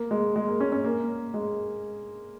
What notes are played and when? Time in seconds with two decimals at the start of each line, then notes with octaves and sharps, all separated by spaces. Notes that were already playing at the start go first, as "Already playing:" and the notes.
Already playing: A#3
0.11 G#3
0.36 G#3
0.48 A#3
0.60 C#4
0.72 C#4
0.84 A#3
1.34 G#3